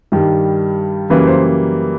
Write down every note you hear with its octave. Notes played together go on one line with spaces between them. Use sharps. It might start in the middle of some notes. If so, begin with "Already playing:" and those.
G2 D#3 G3
F#2 C#3 E3 G3 A#3 B4
C5